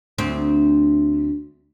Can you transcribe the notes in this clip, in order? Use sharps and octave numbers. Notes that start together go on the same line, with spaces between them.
D2 C4